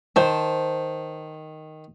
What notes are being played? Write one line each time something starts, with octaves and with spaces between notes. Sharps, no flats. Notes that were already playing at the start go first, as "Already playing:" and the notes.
D#3 C5 A5